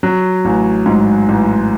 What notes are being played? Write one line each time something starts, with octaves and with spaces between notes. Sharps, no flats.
F#3
A1
G#2
A1